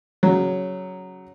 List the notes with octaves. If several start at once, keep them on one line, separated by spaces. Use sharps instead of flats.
C#3 F#3